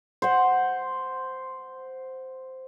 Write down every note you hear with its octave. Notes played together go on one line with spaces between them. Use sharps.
C5 F#5